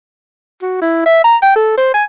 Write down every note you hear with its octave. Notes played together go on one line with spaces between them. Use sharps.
F#4
E4
E5
A#5
G5
A4
C5
G#5